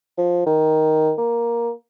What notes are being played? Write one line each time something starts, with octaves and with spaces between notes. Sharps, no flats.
F3
D#3
A#3